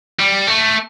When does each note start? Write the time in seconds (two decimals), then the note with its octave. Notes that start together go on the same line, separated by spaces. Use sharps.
0.19 G3
0.47 A3